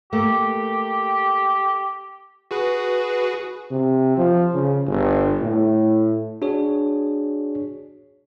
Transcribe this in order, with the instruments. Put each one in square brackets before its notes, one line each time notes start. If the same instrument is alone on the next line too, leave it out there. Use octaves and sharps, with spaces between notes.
[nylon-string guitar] A3 A#3 [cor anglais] G4
[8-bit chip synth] F#4 G#4 B4
[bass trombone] C3
F3
C#3
G1
A2
[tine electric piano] D4 F#4 G#4 C#5